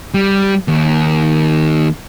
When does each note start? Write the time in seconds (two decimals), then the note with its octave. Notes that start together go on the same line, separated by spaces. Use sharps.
0.14 G3
0.68 D#2